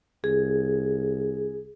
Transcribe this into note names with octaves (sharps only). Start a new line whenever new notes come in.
C2 G#4